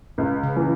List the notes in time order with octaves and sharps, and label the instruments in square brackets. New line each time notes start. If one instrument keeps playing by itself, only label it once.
[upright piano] C#2
[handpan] C#3
[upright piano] E3